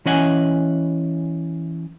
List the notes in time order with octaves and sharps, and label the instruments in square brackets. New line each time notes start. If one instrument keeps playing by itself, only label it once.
[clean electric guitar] E3 C#4 D#5 F#5 G#5